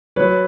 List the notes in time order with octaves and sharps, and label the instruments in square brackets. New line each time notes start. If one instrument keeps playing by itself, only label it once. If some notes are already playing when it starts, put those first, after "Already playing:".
[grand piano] F#3 B4 C#5